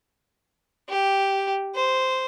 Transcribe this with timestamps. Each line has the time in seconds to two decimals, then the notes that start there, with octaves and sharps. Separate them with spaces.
0.89 G4
1.75 C5